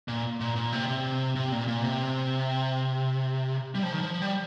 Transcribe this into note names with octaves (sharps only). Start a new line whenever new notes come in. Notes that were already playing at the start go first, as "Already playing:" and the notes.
A#2
A#2
A#2
C3
C3
C3
A#2
A#2
C3
G3
F3
D#3
F3
G3